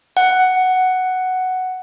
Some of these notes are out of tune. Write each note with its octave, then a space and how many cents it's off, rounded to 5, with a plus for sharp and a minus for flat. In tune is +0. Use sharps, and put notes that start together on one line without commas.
F#5 +5